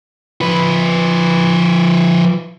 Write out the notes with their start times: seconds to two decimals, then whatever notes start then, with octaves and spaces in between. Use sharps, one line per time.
0.41 F3 B4